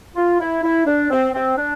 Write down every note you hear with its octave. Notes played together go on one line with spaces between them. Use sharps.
F4
E4
E4
D4
C4
C4
D4